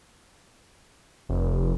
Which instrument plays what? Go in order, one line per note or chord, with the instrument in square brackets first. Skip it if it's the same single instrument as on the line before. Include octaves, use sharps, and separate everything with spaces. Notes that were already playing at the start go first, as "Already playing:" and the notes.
[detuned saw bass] F1